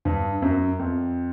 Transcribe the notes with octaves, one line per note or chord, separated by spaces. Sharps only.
G2
F#2
F2